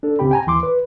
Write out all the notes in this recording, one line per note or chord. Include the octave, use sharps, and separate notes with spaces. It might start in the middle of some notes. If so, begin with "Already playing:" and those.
D4 A4
C#2 C#3 C4 G4 G5 B5
G5 G#5 A#5
D#2 E3 C6 D6
B4